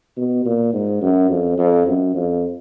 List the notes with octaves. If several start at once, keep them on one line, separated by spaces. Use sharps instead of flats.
B2
A#2
G#2
F#2
F2
F2
F#2
F2